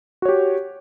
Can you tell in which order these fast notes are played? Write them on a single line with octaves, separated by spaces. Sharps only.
F#4 C#5 G4